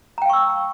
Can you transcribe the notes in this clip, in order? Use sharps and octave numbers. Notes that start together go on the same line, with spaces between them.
F5 G5 A#5 C#6 E6